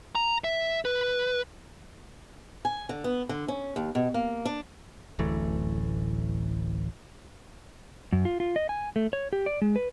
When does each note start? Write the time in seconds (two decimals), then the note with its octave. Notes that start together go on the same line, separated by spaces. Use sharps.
0.15 A#5
0.44 E5
0.85 B4
2.65 G#5
2.89 D3
3.04 B3
3.29 D3
3.48 C#4
3.76 D#2
3.95 B2
4.14 A#3
4.45 D4
5.19 D1 A1 E3 A3
8.12 F#2
8.25 F4
8.40 F4
8.56 D#5
8.69 G#5
8.96 A3
9.13 C#5
9.33 G4
9.46 D5
9.62 G#3
9.76 B4